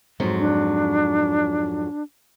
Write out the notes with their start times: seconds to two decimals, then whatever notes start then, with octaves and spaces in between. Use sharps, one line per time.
0.20 F2 G#2 F#3
0.39 D4